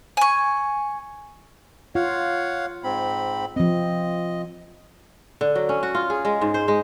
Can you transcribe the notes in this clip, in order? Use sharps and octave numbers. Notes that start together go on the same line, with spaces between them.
G#5 C#6
F4 C#5 F5 F#5
G#2 C4 B5
F3 C4 D#5
D3
F#3
C#4
F#4
F4
G#4
G#3
G#2
C5
G#3